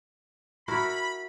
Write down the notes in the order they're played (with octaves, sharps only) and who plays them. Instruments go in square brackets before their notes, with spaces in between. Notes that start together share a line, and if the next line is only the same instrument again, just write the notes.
[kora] E4 F#4 A#4 [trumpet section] B5